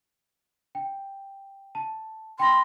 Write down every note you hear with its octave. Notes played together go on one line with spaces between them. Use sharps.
G5
A5
G5 B5 C6 A#6